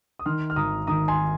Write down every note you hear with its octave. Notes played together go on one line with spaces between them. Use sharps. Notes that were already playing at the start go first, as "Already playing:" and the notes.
D#6
D#3 C6 F6
F6
G#1 A#5 D#6
D#3 A#5 D#6
G#5 C6